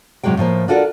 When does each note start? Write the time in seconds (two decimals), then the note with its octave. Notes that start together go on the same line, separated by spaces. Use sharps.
0.23 A2 C3 F#3 G#3 G5
0.37 A2 F3 A#3 C5
0.68 D4 F4 F#4 A4 A#4 D5